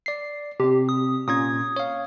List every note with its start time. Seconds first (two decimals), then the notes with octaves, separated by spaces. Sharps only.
0.06 D5 C7
0.60 C3 C4 G4
0.89 D#6
1.28 A#2 C#4 D#6 G#6
1.76 C#5 F5